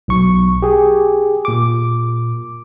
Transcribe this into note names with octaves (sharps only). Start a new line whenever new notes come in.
B1 C#6
G4 G#4
A#2 D6